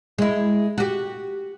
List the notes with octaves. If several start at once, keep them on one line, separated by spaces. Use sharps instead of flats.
G#3 E4
F#4 G4